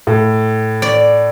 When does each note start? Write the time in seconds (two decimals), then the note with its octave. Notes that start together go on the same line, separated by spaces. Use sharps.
0.07 A2
0.82 D5